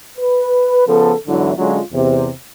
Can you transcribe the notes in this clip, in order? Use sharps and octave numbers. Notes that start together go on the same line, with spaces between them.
B4
C#3 F3 B3 A4
E2 G#2 D3 F#3 E4
D3 F#3 G#3 C#4 F4
E2 C3